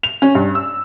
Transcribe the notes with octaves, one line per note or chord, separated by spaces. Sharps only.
F7
C#4
G2
E6